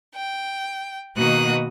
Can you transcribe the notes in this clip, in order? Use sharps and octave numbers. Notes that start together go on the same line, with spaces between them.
G5
B2 D#3 A#3 F#4 D#6 F#6